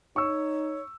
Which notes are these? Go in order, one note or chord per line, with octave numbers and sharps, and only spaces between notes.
D#4 C#5 C#6 E6